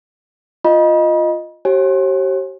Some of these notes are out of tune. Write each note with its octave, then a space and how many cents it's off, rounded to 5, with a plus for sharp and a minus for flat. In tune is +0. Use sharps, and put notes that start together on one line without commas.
F4 +0 D#5 +0 B5 -45
G4 -40 C#5 -45 G#5 +0